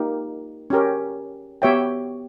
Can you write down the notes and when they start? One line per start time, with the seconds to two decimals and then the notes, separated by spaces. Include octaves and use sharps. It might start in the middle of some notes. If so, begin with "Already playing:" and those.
Already playing: A#3 D#4 G4
0.70 C#4 G4 A#4
1.62 B3 G4 C#5 E5 G5